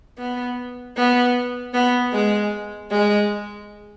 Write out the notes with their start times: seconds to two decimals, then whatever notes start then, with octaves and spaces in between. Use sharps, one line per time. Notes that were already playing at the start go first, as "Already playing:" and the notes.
0.18 B3
0.97 B3
1.74 B3
2.13 G#3
2.90 G#3